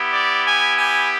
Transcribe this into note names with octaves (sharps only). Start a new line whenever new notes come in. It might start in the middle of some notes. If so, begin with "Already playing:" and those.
Already playing: B3 E4 G4
D5
G#5
G#5